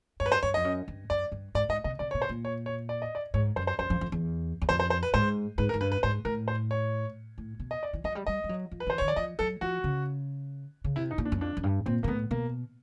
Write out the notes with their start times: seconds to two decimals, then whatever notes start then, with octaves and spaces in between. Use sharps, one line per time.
0.20 G2 C#5
0.26 B4
0.32 C5
0.43 G2 C#5
0.54 F2 D#5
0.65 F#2
0.88 G2
1.10 F#2 D5
1.32 G2
1.55 G#2 D5
1.69 G#2 D#5
1.84 C3 D#5
1.99 C3 D5
2.11 B2 C#5
2.22 C5
2.29 A#2
2.45 C#5
2.66 C#5
2.89 D5
3.02 D#5
3.15 D5
3.34 G#2 C#5
3.56 F#2 C5
3.67 C5
3.79 F#2 C5
3.90 F2
4.01 F2
4.12 E2
4.62 E2
4.69 F2 C5
4.80 C5
4.90 C5
5.03 B4
5.14 G#2 C5
5.58 G#2 B4
5.69 A#4
5.74 G#2
5.80 G2 B4
5.92 B4
6.03 G#2 C5
6.25 A2 A#4
6.48 C5
6.71 C#5
7.38 A2
7.60 B2
7.71 D#5
7.83 D5
7.93 E3
8.04 F#3 D#5
8.15 G3
8.27 G3 D#5
8.44 G3
8.49 F#3
8.71 F3
8.80 B4
8.87 E3 C5
8.98 D#3 C#5
9.08 D5
9.16 F3 D#5
9.39 F#3 A4
9.61 F3 F#4
9.84 C#3
10.84 C#3
10.96 C3 E4
11.11 D#4
11.18 A#2
11.25 D4
11.32 F#2
11.41 F2 D4
11.57 F#2
11.63 G2
11.86 A#2 C4
12.03 A#2 A#3
12.08 A2 B3
12.31 B2 A#3